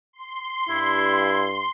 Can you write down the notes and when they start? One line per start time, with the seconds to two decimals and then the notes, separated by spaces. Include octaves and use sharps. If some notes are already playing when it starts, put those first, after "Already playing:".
0.13 C6
0.69 G2 E4